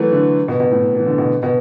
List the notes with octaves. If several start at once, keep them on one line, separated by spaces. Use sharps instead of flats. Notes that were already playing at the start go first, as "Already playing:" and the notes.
Already playing: E3 F#3 A3
D3
B2
B2
A2
E3
D3
B2
B2